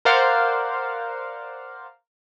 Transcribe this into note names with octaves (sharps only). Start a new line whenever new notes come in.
A#4 C5 D5 F5 F#5